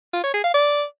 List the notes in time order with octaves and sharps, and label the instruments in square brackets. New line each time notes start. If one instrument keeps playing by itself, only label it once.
[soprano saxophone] F4
C#5
G#4
F5
D5